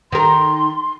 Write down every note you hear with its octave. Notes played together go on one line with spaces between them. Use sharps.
D#3 A#4 C6